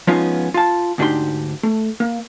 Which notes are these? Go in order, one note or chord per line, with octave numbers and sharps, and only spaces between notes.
F3 G#3 B3 C#4 D#4 F4
F4 A5
D2 G#2 D4 D#4 G4 C6
A3
A#3